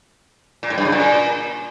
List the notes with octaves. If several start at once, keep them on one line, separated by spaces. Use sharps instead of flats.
A#2
A2
G2
C#3
A#2